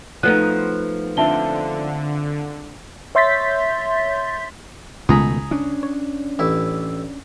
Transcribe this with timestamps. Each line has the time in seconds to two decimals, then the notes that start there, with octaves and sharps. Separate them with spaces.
0.23 F3 A3 B3 D#4 F#6
1.17 D3 C4 F4 C5 E5 A5 G7
3.15 C#5 E5 C6 G6 A6 B6
5.09 C#2 B2 D#3 A3 G#4 A#5 B5
5.51 C#4 D4
5.83 C#5
6.39 A1 E4